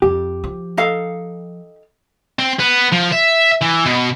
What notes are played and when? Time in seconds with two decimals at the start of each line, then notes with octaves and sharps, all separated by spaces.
0.02 F2 G4
0.44 F3
0.77 D#4 A4 F5
2.39 C4
2.60 B3
2.93 F3
3.12 E5
3.62 E3
3.86 B2